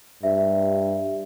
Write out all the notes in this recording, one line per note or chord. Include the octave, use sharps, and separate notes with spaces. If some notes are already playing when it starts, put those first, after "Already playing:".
G2 E5